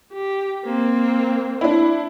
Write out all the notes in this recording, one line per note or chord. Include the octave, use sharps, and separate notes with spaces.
G4
A#3 C4
D4 E4